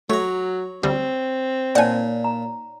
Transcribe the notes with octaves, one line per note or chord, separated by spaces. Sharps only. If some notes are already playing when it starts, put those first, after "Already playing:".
F#3 A3 C#5 A#5
D2 G3 C4
A#2 D#4 C#5 D5 F#5 G#5
A#5